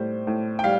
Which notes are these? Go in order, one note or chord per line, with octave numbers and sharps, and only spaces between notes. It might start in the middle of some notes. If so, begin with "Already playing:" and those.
Already playing: A2 G3 C5
A2
G5
G3 F5